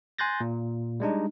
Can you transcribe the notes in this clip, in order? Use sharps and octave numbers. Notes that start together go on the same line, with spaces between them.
G#5 C6 F#6 G6 A6 A#6
A#2
G3 G#3 D4 D#4